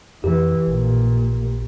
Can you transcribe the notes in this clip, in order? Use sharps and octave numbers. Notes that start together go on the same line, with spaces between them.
F2 E3 G4
A#1 A#2